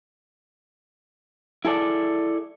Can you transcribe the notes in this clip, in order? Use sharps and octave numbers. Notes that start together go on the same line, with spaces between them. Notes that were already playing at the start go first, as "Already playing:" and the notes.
E4 G#4 A4 D5